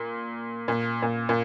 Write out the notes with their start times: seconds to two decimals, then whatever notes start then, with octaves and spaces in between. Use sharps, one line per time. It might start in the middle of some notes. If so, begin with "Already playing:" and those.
Already playing: A#2
0.68 A#2
1.02 A#2
1.29 A#2